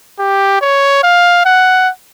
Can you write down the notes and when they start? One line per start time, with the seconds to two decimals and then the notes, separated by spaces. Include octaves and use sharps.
0.19 G4
0.61 C#5
1.03 F5
1.45 F#5